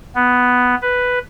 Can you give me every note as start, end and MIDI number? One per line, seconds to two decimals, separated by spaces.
0.15 0.75 59
0.82 1.19 71